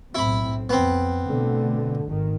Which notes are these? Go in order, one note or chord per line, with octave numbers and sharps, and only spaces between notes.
B1 A2 C4 E4 B5
F2 B3 C4
B2 D3 A3
G#1 D#3